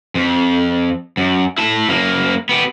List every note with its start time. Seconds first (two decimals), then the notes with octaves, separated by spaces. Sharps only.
0.15 F2
1.17 F#2
1.58 E4 A5
1.88 F#2 A#3
2.49 B3 G4